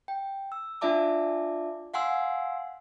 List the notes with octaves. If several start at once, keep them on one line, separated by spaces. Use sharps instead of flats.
G5
E6
D4 F4 D5 E5 A5 D6
F5 F#5 G#5 C6 E6